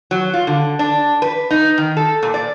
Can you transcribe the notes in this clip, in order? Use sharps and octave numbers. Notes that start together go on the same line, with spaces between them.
F#3
F4
D3
D4
B4
D#4
D#3
A4
A#2
D5